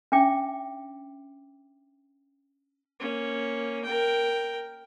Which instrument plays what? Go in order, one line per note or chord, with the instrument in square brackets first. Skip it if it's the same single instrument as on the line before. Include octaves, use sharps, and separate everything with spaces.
[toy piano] C#4 D4 E5 G5 D6
[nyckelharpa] A#3 C#4
A#4 G5